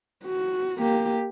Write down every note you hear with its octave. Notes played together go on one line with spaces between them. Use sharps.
F#4
A#3 G4